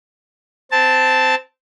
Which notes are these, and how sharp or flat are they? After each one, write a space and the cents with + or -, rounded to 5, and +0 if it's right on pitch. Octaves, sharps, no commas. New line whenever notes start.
C4 -15 A5 +0